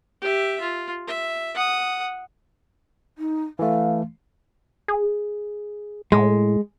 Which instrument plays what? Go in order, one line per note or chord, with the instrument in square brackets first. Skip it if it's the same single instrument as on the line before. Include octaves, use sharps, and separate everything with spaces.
[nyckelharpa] G4 E5
F4
E5
F#5 D#6
[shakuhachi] D#4
[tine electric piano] E3 A3 [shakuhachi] F5
[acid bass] G#4
[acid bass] A2 [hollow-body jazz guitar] G#3